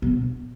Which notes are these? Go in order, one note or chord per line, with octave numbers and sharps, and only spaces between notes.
B2